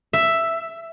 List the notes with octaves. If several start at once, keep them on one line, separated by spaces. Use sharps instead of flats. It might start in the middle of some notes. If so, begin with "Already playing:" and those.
E5